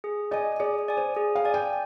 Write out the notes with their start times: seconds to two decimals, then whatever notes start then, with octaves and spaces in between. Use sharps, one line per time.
0.04 G#4
0.31 D5 D#5 G#5
0.60 G#4 D5
0.88 D5 G#5
0.97 C5
1.17 G#4
1.35 F5
1.45 D5 G#5
1.54 G5